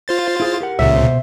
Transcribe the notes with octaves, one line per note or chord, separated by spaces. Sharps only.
F4 C5 A6
E4 G#4
G4 A#4 F#5
C#2 A#2 C#3 E5
B2 C5